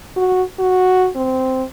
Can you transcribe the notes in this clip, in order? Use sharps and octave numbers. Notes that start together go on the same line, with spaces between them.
F#4
F#4
C4